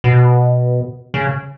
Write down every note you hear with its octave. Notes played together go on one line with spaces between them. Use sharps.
B2
C#3